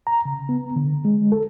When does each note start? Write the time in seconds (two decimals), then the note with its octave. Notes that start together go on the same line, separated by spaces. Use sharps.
0.07 A#5
0.25 C#3
0.49 B3
0.76 D3
1.05 G#3
1.32 A4